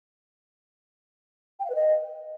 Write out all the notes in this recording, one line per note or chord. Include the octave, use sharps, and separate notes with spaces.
G5
F5
B4
D#5